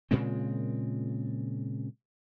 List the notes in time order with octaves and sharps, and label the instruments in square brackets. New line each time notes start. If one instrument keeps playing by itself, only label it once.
[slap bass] A#2 C#3 G#3 C4